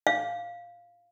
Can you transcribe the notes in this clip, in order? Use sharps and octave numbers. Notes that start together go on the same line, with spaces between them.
F5